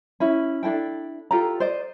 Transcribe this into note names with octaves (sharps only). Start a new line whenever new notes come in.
C#4 E4
D4 E4 A4 G5
F4 G4 A4 A#5
C5 D5 D#5